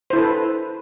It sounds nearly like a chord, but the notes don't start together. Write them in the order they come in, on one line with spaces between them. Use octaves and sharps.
C5 E4 A4 B4